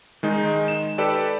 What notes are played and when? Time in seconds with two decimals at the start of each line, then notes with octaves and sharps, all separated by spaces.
0.23 D#3 G#3 D#4
0.68 E7
0.98 G4 A4 B4 D5